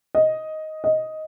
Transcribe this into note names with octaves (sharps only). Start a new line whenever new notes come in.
D#5
D#5